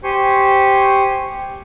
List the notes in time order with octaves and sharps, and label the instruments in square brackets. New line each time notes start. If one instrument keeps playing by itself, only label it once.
[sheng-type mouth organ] G4 C5 G#5 C#6